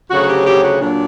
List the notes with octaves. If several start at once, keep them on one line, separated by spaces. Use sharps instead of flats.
D2 C#3 F#3 F#4
G4
G4
F#4
A#2 F#3 D4